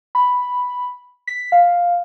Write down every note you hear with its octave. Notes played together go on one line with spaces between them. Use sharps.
B5
B6
F5